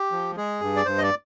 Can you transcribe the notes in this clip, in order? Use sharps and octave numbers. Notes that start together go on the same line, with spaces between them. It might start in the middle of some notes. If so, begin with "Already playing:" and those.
Already playing: G4
F3
G#3 G#4
G2
D5
G2 C5
D#5
D5